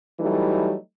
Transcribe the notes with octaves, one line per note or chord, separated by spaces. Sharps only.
E3 F#3 G3 A3 D#4